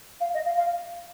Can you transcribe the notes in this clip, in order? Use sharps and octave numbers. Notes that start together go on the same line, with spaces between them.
F5
D#5
F5
F5